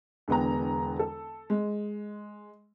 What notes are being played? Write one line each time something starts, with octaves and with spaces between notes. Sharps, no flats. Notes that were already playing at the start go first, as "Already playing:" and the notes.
E1 D3 B3 G5 A#5
A4
G#3